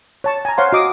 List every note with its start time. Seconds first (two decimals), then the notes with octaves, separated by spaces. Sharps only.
0.24 C#5 A5 C#6
0.45 G#5 A#5
0.58 C5 C#5 F5 F#5 C6
0.73 F#4 D#5 D6 D#6